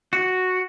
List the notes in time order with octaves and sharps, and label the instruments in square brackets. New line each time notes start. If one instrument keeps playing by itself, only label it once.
[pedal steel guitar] F#4